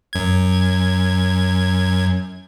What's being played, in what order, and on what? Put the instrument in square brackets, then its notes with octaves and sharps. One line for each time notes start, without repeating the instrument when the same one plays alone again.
[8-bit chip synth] F#2 G#6